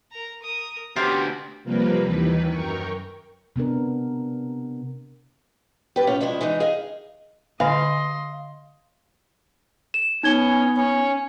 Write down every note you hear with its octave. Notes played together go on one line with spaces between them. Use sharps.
A#4 A#5
A#4 D#6
D2 B3 C#4 F4 G4 C5 D6
C3 F3 G3 A#3 A#4 B4
D#2 D#3 E3 B4
F#2 A#4 G5 C#6
C3 B3 D4 A#4
G4 B4
A2 C#4 F4
G2 F3 G#3 E4
E3 G#3 D#4
G#4 D#5 F5
D3 D#5 F5 G#5 C6
E7
B3 C#4 D#4 G#6 G7
C#4